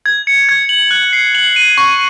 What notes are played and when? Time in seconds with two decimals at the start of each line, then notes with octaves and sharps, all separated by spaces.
0.06 G#6
0.27 C#7
0.49 G#6
0.69 F#7
0.91 F#6
1.13 C7
1.35 F#7
1.56 D#7
1.78 C#6